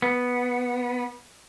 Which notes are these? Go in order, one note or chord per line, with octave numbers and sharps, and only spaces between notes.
B3